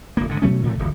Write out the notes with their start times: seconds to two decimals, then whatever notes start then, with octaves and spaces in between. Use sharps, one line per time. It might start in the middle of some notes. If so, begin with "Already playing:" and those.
0.17 F1 A#3
0.29 G#2 D3
0.42 B2 F#3 A3 C#4
0.63 A2 C3 E3 A3
0.79 D1 G1 E2